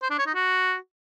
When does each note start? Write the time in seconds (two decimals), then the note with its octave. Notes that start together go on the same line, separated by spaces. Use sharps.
0.02 C5
0.10 D4
0.19 C#5
0.27 D#4
0.35 F#4